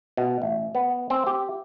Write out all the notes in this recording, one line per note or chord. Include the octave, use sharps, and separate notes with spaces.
B2
A1
B3
C4
G4